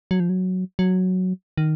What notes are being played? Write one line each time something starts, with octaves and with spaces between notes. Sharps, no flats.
F#3
F3
F#3
F#3
D#3